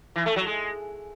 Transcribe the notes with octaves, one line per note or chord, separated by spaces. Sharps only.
E3
A3
F#3
G#3